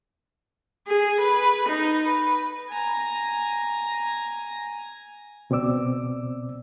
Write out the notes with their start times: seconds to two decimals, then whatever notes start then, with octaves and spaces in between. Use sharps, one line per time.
0.88 G#4
1.21 B4
1.69 D#4
2.05 B4
2.70 G#5 A#5
5.50 C#2 B2 C4 D5 D6 E6